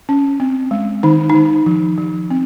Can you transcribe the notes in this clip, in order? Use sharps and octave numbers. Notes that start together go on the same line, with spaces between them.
C#4
C4
G#3
D#3 D#4
D#3 D#4
F3
F3
C4